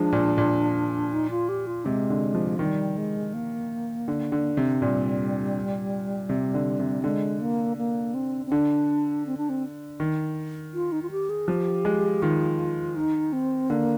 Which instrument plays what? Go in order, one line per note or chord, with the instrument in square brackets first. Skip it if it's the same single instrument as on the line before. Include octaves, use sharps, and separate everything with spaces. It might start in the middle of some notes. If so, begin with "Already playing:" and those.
Already playing: [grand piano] F3 G#3 [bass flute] D4
[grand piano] A#2
A#2
[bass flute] D#4
F4
G4
F4
[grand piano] C3 [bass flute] G#3
[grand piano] D3
F3
[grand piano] D#3 [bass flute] G3
[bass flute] G#3
A#3
[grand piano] D3
D3
C3
[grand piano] A#2 [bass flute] G3
[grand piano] C3
D3
C3
[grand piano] D3 [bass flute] G#3
[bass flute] A#3
A#3
C4
C4
[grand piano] D3 [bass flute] D4
[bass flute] C4
D4
C4
[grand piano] D#3
[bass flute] F4
D#4
F4
G4
G#4
[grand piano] F3 [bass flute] G4
[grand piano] G#3
[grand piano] D#3 [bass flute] F4
[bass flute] D#4
C4
[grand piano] D3 [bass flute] A#3